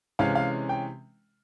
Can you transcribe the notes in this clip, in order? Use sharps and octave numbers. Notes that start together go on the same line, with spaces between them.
C3 E3 G#3 C#4 F5
F5
G5